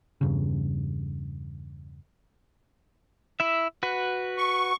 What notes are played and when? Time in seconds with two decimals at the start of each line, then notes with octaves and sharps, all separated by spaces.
0.21 E2 G2 C#3
3.40 E4 E5
3.83 F#4 B4
4.38 C#6